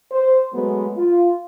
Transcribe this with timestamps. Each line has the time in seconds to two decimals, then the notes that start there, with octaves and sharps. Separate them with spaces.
0.12 C5
0.54 F#3 G#3 A3 B3
0.97 F4